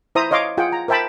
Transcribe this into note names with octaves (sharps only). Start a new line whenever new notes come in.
E4 C5 E5 A#5 D#6
C#5 D#5 F5 C6 D6
F4 G#4 F#5 G5
A#5
A#4 C5 E5 G5 A5 B5